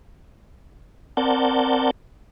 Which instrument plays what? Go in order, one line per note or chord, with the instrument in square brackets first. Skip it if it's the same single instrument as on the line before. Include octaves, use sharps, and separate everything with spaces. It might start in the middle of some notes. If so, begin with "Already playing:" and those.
[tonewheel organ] C4 A#4 D5 F#5 A5 G6